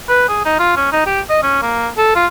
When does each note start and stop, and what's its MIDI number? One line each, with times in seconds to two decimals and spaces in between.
0.09 0.26 71
0.28 0.44 68
0.45 0.55 63
0.59 0.76 65
0.76 0.91 61
0.92 1.01 63
1.06 1.20 67
1.30 1.41 75
1.43 1.59 61
1.62 1.88 58
1.98 2.15 69
2.16 2.27 65